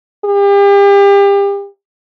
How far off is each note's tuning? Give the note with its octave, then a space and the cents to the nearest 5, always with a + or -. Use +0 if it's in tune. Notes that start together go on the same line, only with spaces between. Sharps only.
G4 +35